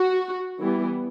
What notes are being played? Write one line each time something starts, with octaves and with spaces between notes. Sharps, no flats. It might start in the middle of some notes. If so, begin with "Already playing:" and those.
Already playing: F#4
E3 G3 B3